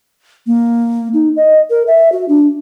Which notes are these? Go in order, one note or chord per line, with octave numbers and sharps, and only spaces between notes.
A#3
D#4
D#5
A#4
E5
F#4
D4